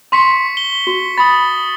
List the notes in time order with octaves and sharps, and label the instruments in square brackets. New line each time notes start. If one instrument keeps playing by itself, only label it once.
[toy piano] C6 [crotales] C#6 B6 C#7
[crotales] G7
[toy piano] F#4
[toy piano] B5 [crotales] D#6 A6